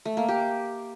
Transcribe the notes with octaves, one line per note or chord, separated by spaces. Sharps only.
A3
A#3
G4